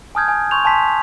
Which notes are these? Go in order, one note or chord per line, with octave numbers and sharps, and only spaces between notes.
G#5 A5 D#6 F6 G6 G#6
G#5
C6 C#6 G6 F7
G#5 A5 C6 B6